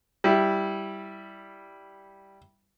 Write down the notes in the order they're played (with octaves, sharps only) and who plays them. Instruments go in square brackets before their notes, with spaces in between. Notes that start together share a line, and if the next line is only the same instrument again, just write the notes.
[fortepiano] G3 E4